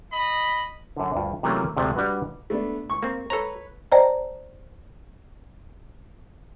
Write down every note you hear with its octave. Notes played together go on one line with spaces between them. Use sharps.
D#5 B5
F#2 D3
D2 G2 F4
C3 E3 F#3 A3 A#3 C#4
D2 C3 F3 G#3 A3
G3 D4 F#4 B4
A3 B3 D4
C#6
A#3 C4
A4 B4 C#5 A#5
C5 D5 D#5 G5 A5 A#5